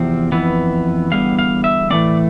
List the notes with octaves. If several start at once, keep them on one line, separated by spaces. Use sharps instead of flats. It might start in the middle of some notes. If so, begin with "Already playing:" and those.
Already playing: E2 C3 F3 C4
F2 E3 B3
E2 D3 G3 B3 F5
F5
E5
A2 E3 A3 C4 D5